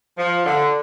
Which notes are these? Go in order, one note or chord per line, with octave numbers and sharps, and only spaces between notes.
F3
D3